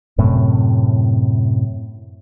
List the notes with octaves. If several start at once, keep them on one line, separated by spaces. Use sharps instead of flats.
F#2 A2 C3